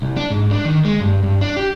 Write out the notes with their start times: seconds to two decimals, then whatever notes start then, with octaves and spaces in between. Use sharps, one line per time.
0.02 C2
0.17 D4
0.30 G#2
0.51 D4
0.65 D#3
0.85 G#3
1.01 G2
1.23 G2
1.41 D4
1.56 G4